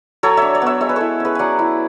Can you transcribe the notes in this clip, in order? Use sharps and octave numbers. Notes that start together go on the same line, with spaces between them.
F#3 A4 C#5
D4 C#5 E5
D5
B3 C#5 E5
G#3 C#5 E5
B4
E4 A4 C#5
C#4 G#4 B4
F#3 D5 F#5 G#5
E4